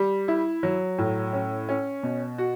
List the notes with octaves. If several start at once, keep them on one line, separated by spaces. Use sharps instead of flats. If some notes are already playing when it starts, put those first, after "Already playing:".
Already playing: G3
E4
F#3
A2
C#4
C#4
B2
F#4